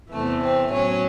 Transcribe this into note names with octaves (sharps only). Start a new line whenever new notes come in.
E2 C3 E3 A3
C4
A2 F#3 C#4